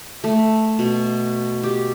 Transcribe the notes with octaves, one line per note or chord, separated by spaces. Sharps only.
A3
B2
G4